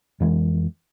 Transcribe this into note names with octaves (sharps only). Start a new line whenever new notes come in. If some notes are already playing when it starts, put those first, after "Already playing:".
F2 E3 G#3